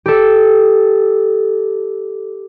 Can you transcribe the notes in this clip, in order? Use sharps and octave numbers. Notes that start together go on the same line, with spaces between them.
G4 A4